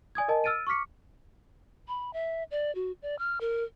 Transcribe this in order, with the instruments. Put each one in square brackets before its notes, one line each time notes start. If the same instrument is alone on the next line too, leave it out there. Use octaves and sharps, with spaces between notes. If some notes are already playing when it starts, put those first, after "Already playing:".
[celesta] D5 G#5 D#6 G#6
A#4 D#5 G#5 A5
E6 F6 A6 D7 D#7
C#6 D6 F6 B6 C#7
[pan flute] B5
E5
D5
F#4
D5
F6
A#4